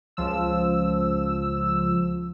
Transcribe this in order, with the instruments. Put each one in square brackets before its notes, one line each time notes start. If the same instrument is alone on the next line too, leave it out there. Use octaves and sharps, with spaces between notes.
[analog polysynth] C#2 F3 E6